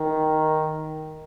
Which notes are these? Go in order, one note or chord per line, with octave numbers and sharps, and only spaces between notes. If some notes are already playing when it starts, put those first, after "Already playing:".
Already playing: D#3